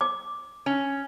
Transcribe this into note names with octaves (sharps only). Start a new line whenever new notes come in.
D6
C#4